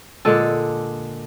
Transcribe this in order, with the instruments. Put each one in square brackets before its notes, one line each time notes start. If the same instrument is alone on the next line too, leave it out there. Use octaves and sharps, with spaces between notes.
[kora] A#2 D3 G#3 A4